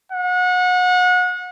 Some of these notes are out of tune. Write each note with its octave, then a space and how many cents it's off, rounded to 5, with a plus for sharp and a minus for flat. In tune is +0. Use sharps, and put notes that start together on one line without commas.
F#5 -30